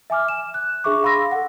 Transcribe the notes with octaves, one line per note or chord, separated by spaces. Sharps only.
E5 G#5 D6 F6
E7
F#6
D4 G#4 E5 C#6 D6
F5 B5 C6 E6 A#6
A4 F#5